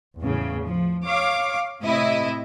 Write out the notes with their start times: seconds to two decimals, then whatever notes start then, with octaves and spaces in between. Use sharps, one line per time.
0.19 E2 A2 C#3
0.64 F3
1.06 C#5 F5 D6
1.83 A2 C3 E4 D#5